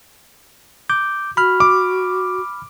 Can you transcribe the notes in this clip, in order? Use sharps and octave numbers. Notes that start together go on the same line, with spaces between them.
D6 G6
F#4 B5 F6
D6